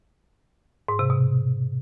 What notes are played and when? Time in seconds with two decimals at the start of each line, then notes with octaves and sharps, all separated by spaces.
0.88 G#2
0.99 C3
1.10 B2